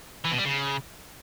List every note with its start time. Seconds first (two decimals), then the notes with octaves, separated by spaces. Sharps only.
0.25 E3
0.31 B2
0.38 G3
0.45 C#3